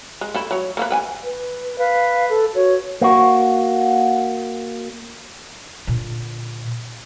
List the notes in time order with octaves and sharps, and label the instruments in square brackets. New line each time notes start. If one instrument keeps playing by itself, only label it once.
[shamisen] G#3
A3 E4
F#3 C#5
A3 A#3 B4
B4 G5 G#5
[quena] B4
[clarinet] B4 [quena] F5
[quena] A4
[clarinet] F#4 [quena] C#5
[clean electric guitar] A#3 F#4
[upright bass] A#2 D3